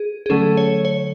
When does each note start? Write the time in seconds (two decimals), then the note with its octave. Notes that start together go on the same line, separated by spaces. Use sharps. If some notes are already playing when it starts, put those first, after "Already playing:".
Already playing: G#4
0.26 G#4
0.30 D3 F#3 A3 C#4 A4
0.57 C#5
0.85 C#5